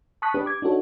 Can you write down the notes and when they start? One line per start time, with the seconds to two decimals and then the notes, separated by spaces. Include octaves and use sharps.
0.22 A5 C#6 D#6 F#6 B6
0.34 D4 G4 B4
0.46 D6 G#6
0.62 D4 D#4 F#4 A4 C#5